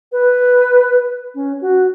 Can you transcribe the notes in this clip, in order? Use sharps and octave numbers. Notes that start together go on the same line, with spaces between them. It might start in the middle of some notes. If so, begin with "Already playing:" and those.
B4
C#4
F#4